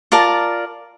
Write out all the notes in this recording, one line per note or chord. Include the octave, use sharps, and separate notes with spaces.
F4 A#4 D5 A5